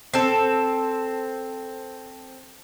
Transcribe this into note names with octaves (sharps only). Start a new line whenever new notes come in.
C4 A4